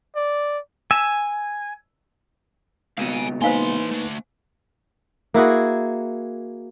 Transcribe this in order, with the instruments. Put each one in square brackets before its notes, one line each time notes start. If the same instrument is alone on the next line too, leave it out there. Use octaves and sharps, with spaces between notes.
[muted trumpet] D5
[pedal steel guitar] G#5 [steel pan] E6
[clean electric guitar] C#2 B2 [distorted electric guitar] F5 G#5
[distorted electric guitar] E3 C6 [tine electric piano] A#3 D#4 B4 [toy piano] C5 F5 G#5
[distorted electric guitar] A3 D4
[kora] A#3 E4 F#4 G#4